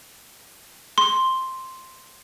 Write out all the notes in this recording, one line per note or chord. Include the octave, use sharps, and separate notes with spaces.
C6